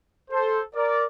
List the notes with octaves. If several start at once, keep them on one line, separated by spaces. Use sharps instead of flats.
A4 C5
A#4 D5